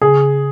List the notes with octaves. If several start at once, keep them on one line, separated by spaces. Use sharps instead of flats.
C#3 G#4